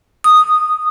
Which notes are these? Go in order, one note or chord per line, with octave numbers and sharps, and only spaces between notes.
D#6